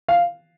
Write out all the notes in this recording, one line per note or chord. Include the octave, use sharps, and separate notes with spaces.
F5